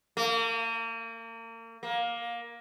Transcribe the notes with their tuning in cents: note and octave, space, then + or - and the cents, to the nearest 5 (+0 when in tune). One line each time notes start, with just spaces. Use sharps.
A#3 -35
A#3 +15